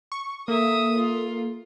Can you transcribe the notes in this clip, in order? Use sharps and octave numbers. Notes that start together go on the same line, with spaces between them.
C#6
A#3 A4 E5 D#6
F4